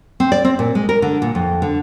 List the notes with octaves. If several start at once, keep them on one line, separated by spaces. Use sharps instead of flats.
C4
D5
C4
A#2
G#3
A#4
D3
A#2
F2
D3